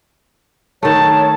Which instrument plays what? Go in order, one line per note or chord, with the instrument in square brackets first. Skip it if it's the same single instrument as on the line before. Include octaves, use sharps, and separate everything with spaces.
[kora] D#3 A3 [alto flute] C#5 [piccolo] A5